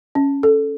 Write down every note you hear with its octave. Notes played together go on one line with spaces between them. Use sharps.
C#4
A4